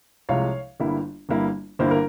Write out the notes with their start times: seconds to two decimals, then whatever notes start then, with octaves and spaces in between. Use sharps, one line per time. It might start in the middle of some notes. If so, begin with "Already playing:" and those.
0.29 C2 C3 F3 G#3 C#5 F5
0.80 G1 G2 G3 A#3 E4
1.29 G1 G2 G3 A#3 E4
1.79 G1 G2 G3 A#3 E4 C5
1.91 A#4